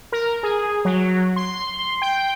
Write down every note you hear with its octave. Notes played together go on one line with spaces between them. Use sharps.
A#4
G#4
F#3
C6
G5